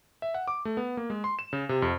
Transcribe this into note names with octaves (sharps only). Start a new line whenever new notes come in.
E5
F#5
D6
A3
B3
A#3
G#3
C6
E7
C#3
C3
F2